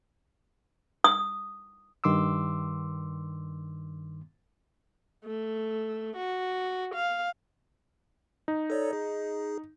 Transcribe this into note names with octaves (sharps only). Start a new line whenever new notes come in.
D#6
G2 D#3 C6 D6 E6
A3
F#4
F5
D#4
A4 C#5 D5
G#4